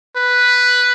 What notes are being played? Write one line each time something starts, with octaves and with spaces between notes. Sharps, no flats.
B4